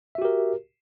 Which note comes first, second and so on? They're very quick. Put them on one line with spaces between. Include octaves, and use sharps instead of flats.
E5 F#4 G4 A#4